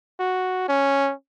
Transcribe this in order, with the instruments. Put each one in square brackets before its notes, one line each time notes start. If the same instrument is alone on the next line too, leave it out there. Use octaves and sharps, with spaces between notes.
[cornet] F#4
C#4